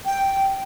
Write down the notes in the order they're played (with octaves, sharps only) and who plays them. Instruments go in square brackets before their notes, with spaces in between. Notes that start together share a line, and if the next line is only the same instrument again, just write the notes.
[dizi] G5